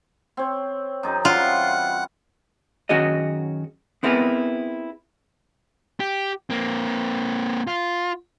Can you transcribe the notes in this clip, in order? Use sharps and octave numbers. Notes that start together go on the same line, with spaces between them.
C4 C#5
F#2 D#4 G#4
E3 G3 F4 F#5
F#2 D#3 C#4 F#4 G#4 D#5
B3 C4 E4 G#4 A#4 B4
G4
A#3 C4
F4